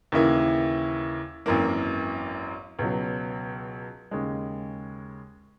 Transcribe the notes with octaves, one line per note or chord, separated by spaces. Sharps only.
D#2 C#3 E3 A#3 E4
G#1 F#2 E3 A#3
C#2 B2 F#3
D#2 C#3 G#3